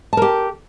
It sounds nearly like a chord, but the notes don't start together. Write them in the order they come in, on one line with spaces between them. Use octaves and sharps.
A5 A#4 G4